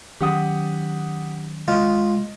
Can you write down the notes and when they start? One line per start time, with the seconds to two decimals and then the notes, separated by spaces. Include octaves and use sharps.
0.21 D#3 F#3 C#4 G4 F#5 D#6
1.68 G#3 F4 D#5